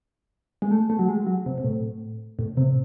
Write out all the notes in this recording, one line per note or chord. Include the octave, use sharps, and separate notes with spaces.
G#3
A3
A3
F#3
G#3
F#3
C3
C3
A2
A2
C3